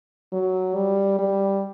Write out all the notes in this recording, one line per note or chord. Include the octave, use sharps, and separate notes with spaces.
F#3
G3
G3